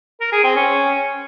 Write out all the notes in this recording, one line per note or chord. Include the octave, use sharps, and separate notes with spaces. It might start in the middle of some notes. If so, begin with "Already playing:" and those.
A#4
G#4
C4
C#4